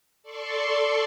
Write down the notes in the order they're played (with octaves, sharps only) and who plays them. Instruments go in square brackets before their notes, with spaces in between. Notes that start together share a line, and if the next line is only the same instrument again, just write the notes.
[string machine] A4 D5 C6 C#6